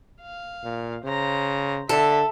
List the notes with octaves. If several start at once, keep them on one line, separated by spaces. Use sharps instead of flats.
F5
A#2
C#3 C5 A#5
D3 A4 E5